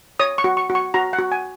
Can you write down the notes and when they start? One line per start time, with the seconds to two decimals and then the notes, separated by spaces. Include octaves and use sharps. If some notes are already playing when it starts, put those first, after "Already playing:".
0.19 C#5 D#6
0.38 C#6
0.44 F#4
0.57 C#6
0.70 F#4
0.75 C#6
0.94 F#4 A#5
1.13 F#5
1.19 F#4
1.32 G#5